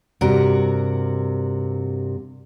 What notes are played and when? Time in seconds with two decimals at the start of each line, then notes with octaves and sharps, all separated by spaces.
0.21 G2 C3 F#4 A#4